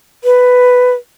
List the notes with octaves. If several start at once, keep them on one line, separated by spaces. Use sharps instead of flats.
B4